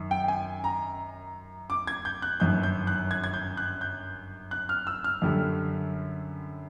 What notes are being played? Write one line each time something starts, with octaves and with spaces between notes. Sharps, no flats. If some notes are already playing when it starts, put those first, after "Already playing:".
Already playing: F#2 D#3
G5
G5
G#5
A#5
D6
G#6
G6
F#6
G1 F#2 D#3 G6
G6
F#6
G#6
G#6
G6
F#6
G6
F#6
F6
E6
F6
F#2 D3 G3